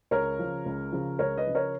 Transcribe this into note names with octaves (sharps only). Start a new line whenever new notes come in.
C#2 A#4 C#5
C#3 F3
C#2
C#3 F3
C#2 A#4 C#5
B4 D#5
C#3 F3
A#4 C#5